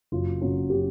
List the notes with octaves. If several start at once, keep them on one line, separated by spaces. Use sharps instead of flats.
F#1 F#2 C#3 F#3 F4
F#1 F#2 C#3 F#3
C#3 F#3 G4